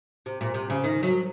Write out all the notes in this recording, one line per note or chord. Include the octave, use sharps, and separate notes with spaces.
C3
A#2
C3
C#3
D#3
F#3